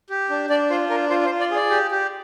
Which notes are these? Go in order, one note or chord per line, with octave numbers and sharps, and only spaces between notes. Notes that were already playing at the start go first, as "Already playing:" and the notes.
G4
D4
D4 D5
F4 C5
D4 A#4
F4 C5
C5
F4
D5
G#4 D5
G4
G4